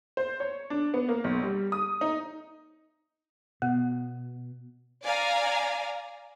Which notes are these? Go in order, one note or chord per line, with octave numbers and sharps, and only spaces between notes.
C5
C#5
D4
B3
A#3
B1
G3
D#6
D#4
B2 B3
D5 F5 G#5 A#5